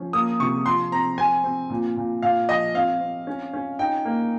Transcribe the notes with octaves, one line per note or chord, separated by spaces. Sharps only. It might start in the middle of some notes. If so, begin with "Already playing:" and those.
Already playing: F3 C#4
A#3 D#6
C3 C#6
F3 C6
C4 A#5
C4 G#5
C4
A#2
A#2
A#2 F5
F3 D#5
C4 F5
C4
C#4
C#4
D#4 G5
A#3